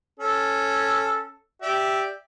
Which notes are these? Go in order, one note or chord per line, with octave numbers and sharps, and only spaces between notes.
C#4 A4
G4 D5 E5